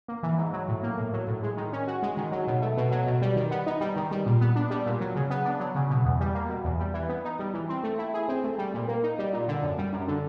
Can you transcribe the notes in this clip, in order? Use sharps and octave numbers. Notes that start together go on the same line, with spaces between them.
A#3
E3
G#2
F#3
A2
A#3
A2
F#3
A2
G#3
D#3
C#4
F#4
G#3
D#3
F#3
B2
A3
B2
F#3
B2
G3
D#3
B3
D#4
G3
D#3
G3
A#2
B3
D4
G3
A#2
F#3
C#3
B3
D4
F#3
C#3
B2
E2
G3
A#3
B2
E2
G3
E3
B3
D#4
G3
E3
C4
A3
E4
G#4
C4
A3
G3
A#2
A#3
D#4
G3
A#2
D3
F#2
G3
F#2
D3